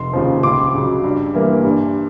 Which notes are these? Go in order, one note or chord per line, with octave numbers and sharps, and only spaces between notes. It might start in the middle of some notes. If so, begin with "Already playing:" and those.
Already playing: F1 C6
D#2 C#3 F3
C#2 C6 D6
C#3 F#3
G2
E3 G3 A#3
G2